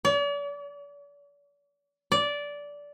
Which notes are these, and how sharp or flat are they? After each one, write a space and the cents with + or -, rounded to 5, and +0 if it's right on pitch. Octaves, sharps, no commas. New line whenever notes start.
D5 -45
D5 -15